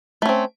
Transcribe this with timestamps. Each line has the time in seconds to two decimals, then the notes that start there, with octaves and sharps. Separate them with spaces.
0.22 A3
0.25 C#4
0.29 C4